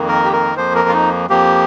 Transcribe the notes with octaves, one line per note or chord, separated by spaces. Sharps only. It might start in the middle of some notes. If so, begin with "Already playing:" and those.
Already playing: F2 D#3 A#3
A#4
G4
A#4
F2 F3 A#3 C5
A#4
F4
D#4
F2 F3 A#3 G4